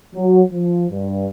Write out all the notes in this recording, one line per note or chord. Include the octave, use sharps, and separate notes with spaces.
F#3
F3
G2